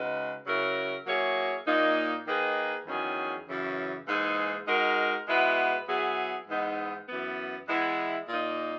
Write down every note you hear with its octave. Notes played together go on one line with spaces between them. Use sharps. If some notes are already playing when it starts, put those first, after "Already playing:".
Already playing: C#3 G#3 D#4 F#4 B4
C#3 F#3 C#4 E4 A#4
F#3 A#3 E4 G#4 C#5
A#2 A#3 D#4
D#3 A#3 D#4 G#4 B4
E2 D#3 F#3 C#4 G#4
F#2 C#3 E3
G#2 E3 A#3 D#4 G#4
G#3 D#4 F#4 A#4
B2 G#3 B3 E4 B4
F#3 B3 E4 G#4
G#2 E3 B3 D#4
F#2 E3 B3
E3 G#3 B3 E4
A#2 A#3 D#4